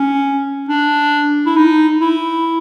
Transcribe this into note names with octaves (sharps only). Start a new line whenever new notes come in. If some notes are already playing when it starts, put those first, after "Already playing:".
Already playing: C#4
D4
E4
D#4
E4